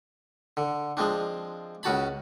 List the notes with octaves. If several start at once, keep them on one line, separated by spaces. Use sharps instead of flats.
D3
F3 G#3 C4 D4
C#2 C#3 F#4 A5 B5